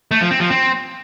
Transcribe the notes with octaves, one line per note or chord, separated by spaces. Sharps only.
A3
F3
C4
F3
C4